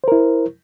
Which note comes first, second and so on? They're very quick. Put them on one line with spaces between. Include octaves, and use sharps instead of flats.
C5 A#4 E4